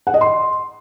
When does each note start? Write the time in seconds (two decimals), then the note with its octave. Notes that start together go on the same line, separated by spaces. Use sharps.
0.07 F#5
0.14 D#5
0.21 C6